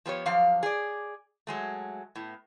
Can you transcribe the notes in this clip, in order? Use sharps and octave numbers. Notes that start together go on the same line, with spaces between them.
F3 B3 G4 C#5
F#2 F3 G4 F5
G#4 D5
F#3 G#3 A3
A2 B3